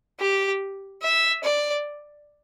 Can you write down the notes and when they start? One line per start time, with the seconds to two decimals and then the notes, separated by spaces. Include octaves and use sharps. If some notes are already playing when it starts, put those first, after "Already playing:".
0.20 G4
1.03 E5
1.44 D5